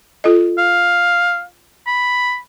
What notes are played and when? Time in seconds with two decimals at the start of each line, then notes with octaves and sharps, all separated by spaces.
0.24 F4 A4 D#5
0.58 F5
1.87 B5